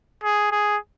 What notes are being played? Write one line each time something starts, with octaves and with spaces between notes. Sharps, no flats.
G#4
G#4